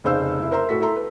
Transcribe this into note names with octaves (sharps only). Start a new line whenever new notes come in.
F1 C#3 D#4 C5 F5 E6
F1 E4
A#4 C5 E5 A#5 C6
A2 F#4 A4 B6
E4 A4 A#5 C6
B4